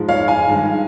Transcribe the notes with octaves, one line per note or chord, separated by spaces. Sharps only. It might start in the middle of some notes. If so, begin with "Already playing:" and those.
Already playing: G#2 F3 G#3
C#5 F5
F5 G#5
G2 D#3 G#3